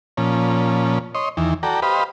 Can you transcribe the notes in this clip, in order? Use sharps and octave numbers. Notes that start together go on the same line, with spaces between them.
A#2 F3 C#4
C#5 D#5 C6
E2 D#3 E3
F#4 A4 D5 G5 A#5
G4 B4 C5 D#5 F5 B5